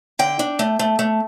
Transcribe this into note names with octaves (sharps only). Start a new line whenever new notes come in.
D3 G5
D4
A3
A3
A3